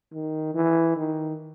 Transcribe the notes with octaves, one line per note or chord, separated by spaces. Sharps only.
D#3
E3
D#3